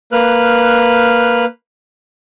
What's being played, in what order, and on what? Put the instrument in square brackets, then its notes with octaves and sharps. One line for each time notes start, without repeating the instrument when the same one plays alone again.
[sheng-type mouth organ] A#3 B4 F6 F#6